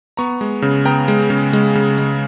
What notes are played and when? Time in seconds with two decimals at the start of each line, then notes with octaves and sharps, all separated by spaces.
0.17 B3 A#5 C#6
0.41 G#3
0.62 C#3
0.85 B3 G5 A#5
1.08 G#3
1.30 C#3
1.53 G#3
1.75 C#3
1.98 G#3